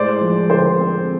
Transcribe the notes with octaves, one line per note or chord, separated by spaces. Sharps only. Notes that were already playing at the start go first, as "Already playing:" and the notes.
Already playing: A2 G#3 C5 D5
F3
D3 C5 D5
C4